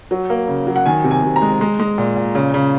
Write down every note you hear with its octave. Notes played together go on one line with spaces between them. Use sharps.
F#3
A#3
C#3
F#3
F#5
D#3 G#5
C3
G#5
C3
A#5
G#3
G#3
G#3
A#2
A#2
C#3
C#3